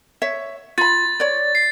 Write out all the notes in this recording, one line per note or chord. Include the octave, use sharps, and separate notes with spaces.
C#5 E5
F4 B5 A6
C#5 D5
C7